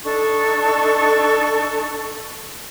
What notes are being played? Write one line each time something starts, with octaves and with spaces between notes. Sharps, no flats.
D4 D#4 A4 C#6